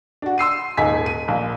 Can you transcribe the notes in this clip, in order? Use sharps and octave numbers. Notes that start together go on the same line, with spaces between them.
D4 F#4
C6 E6 C7 D#7
D#1 G#2 D#4 G#5 B6
D#7
A#1